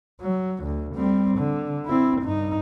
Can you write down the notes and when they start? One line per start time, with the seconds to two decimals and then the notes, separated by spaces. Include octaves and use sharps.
0.21 F#3
0.64 D2
0.96 G3 C4
1.38 D3
1.87 C4 E4
2.22 G2 D#4